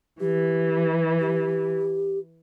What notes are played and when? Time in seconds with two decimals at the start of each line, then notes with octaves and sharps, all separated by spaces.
0.20 E3 G4
1.20 G4